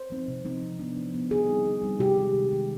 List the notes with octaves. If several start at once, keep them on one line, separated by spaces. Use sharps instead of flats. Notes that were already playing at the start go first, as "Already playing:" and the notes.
Already playing: C5
F3 C4 D#4
C3
F3 C4 D#4
F3
B3 D4
F3
B3 D4
D3 G#4
G3 C4 D#4
D3
G3 C4 D#4
C3 G4
D#3 G#3
C3
D#3 G#3